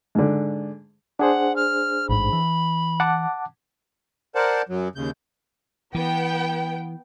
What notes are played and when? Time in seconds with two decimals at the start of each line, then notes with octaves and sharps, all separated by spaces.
0.15 G#2 D3
1.19 D4 G#4 C5 F#5
1.56 F6
2.09 A1 G#2 B5
2.33 E3
3.00 F#5 A5 D6
4.35 A#4 C5 D5 F#5 A5
4.69 F#2 F#3
4.96 D#2 C#3 G6
5.95 E3 B3 G5